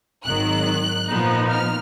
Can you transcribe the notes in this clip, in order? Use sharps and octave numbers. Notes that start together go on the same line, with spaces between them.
G#1 G#2 D#3 F#3 F#6
A#2 F3 B3 D#4
F6